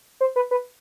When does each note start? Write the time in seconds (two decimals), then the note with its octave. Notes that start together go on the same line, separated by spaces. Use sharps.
0.21 C5
0.36 B4
0.51 B4